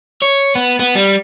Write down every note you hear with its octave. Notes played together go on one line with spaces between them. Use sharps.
C#5
B3
B3
G3